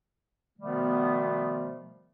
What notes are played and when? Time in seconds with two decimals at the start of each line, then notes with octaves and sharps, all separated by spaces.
0.58 B2 D#3 F3 G3 A3 B3